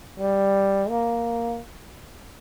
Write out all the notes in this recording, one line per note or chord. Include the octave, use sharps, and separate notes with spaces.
G3
A#3